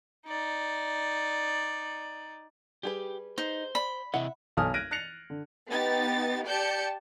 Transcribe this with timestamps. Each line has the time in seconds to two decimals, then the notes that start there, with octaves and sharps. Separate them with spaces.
0.26 D#4 D5
2.83 G3 G4 G#4 B4
3.38 D#4 C5
3.75 D5 B5
4.14 C3 E4 D#5 E5 F#5
4.57 B1 A4 G#5 D#6 F6
4.74 F6 F#6 G#6 A#6 D7 D#7
4.91 F#6 A6 A#6 C7 C#7 F7
5.30 D3
5.69 B3 D#4 G4 A6
6.47 G4 D5 A5 G6 C#7